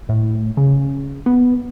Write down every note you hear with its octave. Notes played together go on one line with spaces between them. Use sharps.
A2
C#3
B3